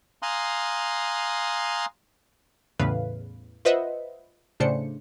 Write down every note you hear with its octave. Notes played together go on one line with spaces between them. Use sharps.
F5 G#5 A#5 C6 D#6 F#6
E2 A2 C#3 B4 F5
F4 B4 C5 D#5 E5 F#5
A2 C#3 D4 C5 C#7